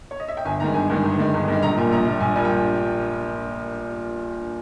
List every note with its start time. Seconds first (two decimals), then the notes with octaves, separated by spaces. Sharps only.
0.11 C#5
0.20 D#5
0.28 E5
0.37 G5
0.45 G1 G#5
0.60 G2 D#3 G#3 A#5
0.74 G1 G#5
0.89 G2 D#3 G#3
1.04 G1
1.18 G2 D#3 G#3
1.33 G1
1.48 G2 D#3 G#3
1.62 A#1 A#5
1.77 A#2 G3 G#5
1.91 A#1 A#5
2.07 A#2 G3
2.21 A#1 G#5
2.36 A#2 G3 G#5
2.45 G5